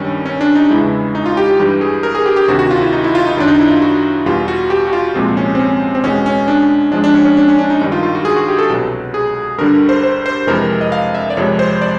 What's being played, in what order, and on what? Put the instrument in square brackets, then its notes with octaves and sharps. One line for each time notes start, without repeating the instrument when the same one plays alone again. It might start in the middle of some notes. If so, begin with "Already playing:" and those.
Already playing: [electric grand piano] G2 D#3 G3 C#4
C#4
D4
D#4
E2 C#3 E3 G#3 E4
D#4
F4
G4
G4
G2 E3 G3 G4
G#4
A#4
G#4
G4
G4
D2 C3 D#3 F#4
F#4
F4
E4
D#4
E4
F4
D#4
F#2 D#3 F#3 D4
D#4
E4
F4
F#4
E2 B2 G3 F4
F#4
G4
F#4
F4
C2 A#2 F3 G#3 C4
C#4
C4
C#4
C4
E2 B2 G#3 C#4
C#4
D4
G#2 F3 G#3 D4
D4
C#4
C#4
D4
C#4
D4
D#4
G2 D#3 G3 D#4
F4
F4
F#4
G#4
F#4
G4
A4
C2 B2 F#3
G#4
G2 D3 G3 A#4
C5
C5
C5
F2 C3 E3 G#3 A#4
D#5
F5
E5
D5
F2 C3 F3 G#3 C#5
C5
D5